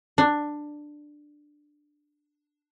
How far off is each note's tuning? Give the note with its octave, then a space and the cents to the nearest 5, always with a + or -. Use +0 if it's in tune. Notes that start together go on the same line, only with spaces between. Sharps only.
D4 +10